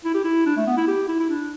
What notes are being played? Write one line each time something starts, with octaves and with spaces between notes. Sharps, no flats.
E4
G4
E4
D4
A3
B3
E4
G4
E4
E4
D4